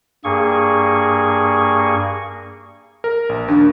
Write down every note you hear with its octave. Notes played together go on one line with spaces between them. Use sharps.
G2 A#3 G#4 C#6
A#4
A#1
D#2 D4